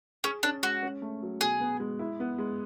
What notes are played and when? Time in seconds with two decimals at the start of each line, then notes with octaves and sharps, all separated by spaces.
0.24 C#4 G#4
0.43 C#4 D4
0.63 G#3 F#4
0.83 C#4
1.02 A3
1.22 F#3
1.41 B2 G#4
1.60 B3
1.80 G#3
1.99 E4
2.20 B3
2.38 G#3